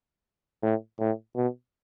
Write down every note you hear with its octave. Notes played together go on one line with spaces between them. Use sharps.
A2
A2
B2